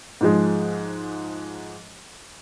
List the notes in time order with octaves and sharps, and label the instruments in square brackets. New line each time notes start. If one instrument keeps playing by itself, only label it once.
[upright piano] G#2 F3 G#3